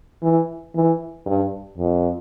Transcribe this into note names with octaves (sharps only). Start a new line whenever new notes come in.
E3
E3
G2
F2